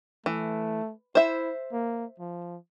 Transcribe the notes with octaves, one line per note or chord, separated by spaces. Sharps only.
E3 A3
E4 C5 E5
A#3
F3